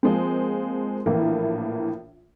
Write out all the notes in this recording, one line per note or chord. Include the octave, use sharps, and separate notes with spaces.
F3 G#3 A#3 C4
A#1 A2 E3 A#3